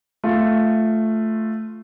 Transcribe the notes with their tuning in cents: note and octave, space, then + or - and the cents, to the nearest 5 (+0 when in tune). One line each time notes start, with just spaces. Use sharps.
A3 +0 F4 +0